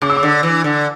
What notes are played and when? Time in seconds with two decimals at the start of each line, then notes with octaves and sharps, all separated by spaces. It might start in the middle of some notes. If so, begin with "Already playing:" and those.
0.02 C#3 D6
0.10 E6
0.16 D6
0.23 D3
0.43 E3
0.64 D3